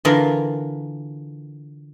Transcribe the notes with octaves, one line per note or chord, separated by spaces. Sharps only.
D3 E3 F4 A#4